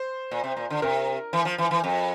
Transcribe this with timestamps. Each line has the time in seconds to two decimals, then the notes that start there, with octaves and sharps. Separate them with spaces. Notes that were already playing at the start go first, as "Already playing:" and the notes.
Already playing: C5
0.31 A#2
0.44 C3
0.57 A#2
0.70 D3
0.82 C3 A#4
1.33 E3
1.45 F3
1.58 E3
1.71 E3
1.84 F2